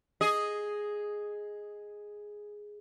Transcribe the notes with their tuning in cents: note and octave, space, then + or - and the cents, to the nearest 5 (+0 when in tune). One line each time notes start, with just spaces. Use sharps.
G#4 +0 D#5 +0